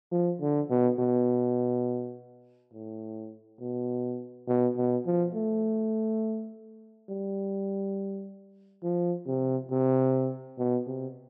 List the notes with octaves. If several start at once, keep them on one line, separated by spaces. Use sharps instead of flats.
F3
D3
B2
B2
A2
B2
B2
B2
F3
A3
G3
F3
C3
C3
B2
C3